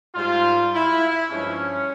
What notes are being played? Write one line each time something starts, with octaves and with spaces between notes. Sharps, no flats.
G#2 G3 F4
E4
G2 F3 G#3 C#4